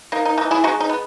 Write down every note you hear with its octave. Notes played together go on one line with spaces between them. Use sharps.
A#3 D#4
D#4
E3 D#4
E4 G#4
G#3 D#4 F#4
D#4
B3